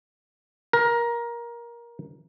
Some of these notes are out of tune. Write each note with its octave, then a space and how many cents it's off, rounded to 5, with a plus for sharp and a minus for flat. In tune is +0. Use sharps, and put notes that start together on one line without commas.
A#4 +15